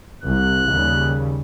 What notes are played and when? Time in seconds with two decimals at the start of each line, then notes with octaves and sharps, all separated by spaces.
0.23 C2 F#6
0.70 D#2 C#3 G3